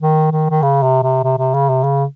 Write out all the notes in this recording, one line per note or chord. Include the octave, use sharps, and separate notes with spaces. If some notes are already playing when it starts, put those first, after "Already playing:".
D#3
D#3
D#3
C#3
C3
C3
C3
C3
C#3
C3
C#3